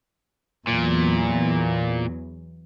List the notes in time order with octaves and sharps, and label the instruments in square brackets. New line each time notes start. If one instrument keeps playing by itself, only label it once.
[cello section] E2 F#3 [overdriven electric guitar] A#2